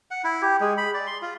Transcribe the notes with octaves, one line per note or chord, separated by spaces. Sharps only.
F#5
E4
G4
G#3
B5
D5
C6
F4